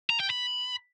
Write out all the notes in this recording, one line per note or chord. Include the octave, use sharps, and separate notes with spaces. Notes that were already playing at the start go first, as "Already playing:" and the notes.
A#5
G5
B5